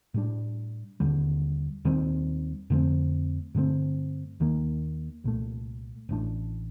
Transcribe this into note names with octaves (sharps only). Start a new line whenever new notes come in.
A2 G3 D4
D#2 D3 G3
D#2 D#3 G3 C4
F2 D3 A3 C4
G2 D3 A3 C4
D#2 D#3 A#3
C2 A#2 A3
A1 A2 A3 D4